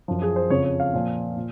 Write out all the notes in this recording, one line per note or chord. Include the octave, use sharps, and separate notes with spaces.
F#2 F3
G#4
C5
F2 C#3 F3 C#5
C#5
F5
A#2 F3
A#2